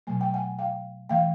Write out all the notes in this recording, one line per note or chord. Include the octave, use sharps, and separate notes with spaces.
B2 F#3 A3 G#5
G5
F#5 G#5
F5 G5
E3 A3 F5 G5